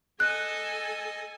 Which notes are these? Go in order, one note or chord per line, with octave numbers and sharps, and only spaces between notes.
A4 D#5 G#5 F#6